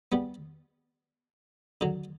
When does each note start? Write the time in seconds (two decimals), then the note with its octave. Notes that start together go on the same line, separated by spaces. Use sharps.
0.12 G3 B3
1.81 D3 F#3